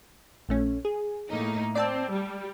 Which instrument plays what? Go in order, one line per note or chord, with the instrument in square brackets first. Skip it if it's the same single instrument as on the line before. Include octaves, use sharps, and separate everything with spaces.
[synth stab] A#1 A3 C#4
G#4
[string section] A2 A#3 D#4
[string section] C4 [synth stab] D5 A5 E6
[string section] G3